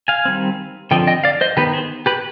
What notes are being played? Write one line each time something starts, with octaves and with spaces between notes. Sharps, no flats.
F5 G#5
D#3 G3 C4
D3 F3 C4 D#5 G5
D#5 G5
D5 F5
C5 D#5
D#3 B3 G4 B4
G#4 C5
G4 B4